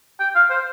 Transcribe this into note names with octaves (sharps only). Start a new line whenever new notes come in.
G5
F5
C5